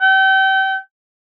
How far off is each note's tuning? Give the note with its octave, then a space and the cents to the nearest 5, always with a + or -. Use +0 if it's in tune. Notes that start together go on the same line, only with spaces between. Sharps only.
G5 -35